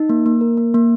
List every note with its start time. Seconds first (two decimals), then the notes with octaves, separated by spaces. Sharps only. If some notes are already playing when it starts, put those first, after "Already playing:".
Already playing: D#4
0.09 A#3
0.26 A#3
0.41 A#4
0.57 A#3
0.74 A#3